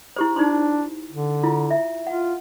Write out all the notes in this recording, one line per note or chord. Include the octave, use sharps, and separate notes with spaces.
E4 G4 C5
D4 D#4 C5 C6
D3
E4 F4
E5
F4 F#5